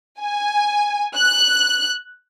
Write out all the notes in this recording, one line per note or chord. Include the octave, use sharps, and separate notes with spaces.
G#5
F#6